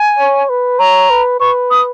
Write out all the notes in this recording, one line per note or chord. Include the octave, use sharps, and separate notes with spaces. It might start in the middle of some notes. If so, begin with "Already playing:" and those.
Already playing: G#5
C#5
B4
C#5 A#5
B4
B4 C#6
D#6